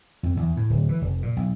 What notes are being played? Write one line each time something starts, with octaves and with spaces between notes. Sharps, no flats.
F2
E2
A2
D1
E3
F1
A#2
B1